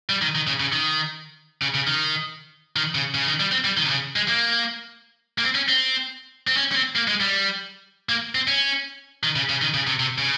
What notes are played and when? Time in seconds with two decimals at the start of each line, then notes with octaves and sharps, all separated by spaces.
0.09 G3
0.22 D#3
0.35 D#3
0.47 C#3
0.60 C#3
0.73 D#3
1.62 C#3
1.74 C#3
1.87 D#3
2.76 D#3
2.95 C#3
3.14 C#3
3.27 D#3
3.40 G3
3.52 C4
3.64 G3
3.77 D#3
3.86 C3
3.90 C#3
4.16 G#3
4.28 A#3
5.38 A#3
5.43 C4
5.55 C#4
5.69 C4
6.47 C4
6.57 C#4
6.72 C#4
6.75 C4
6.96 A#3
7.08 G#3
7.20 G3
8.09 A#3
8.35 C4
8.48 C#4
9.23 D#3
9.36 C#3
9.49 C#3
9.62 D#3
9.74 C#3
9.87 C3
10.00 C3
10.18 C#3